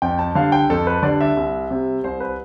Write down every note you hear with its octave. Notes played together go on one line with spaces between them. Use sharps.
F2 G5
A5
D3 G3 F5
G5
F2 A4
B4
D3 G3 D5
E5
C2
C3 G3
C2 C5
B4